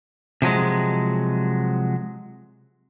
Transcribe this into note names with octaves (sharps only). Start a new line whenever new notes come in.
C3 F3 F#3 G#3